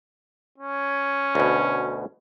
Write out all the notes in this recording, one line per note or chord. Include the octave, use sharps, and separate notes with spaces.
C#4
D2 B2